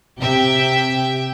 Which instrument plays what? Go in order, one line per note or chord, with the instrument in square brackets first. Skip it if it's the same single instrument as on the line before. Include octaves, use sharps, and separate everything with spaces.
[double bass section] C3 [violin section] G4 E5 G5